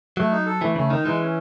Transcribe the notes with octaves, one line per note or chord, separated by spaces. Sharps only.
F#3 A3
D#4
A4
E3 A3
C#3 A3
D#3 D#4
E3 G#3
C#4